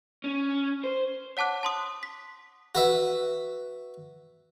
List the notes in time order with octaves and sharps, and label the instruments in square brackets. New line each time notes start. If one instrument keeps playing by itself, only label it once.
[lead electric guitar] C#4
C5
[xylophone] C#5 F#5 A5 D6 F#6
A5 C6 D#6
B6
[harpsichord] F#4 B4 E5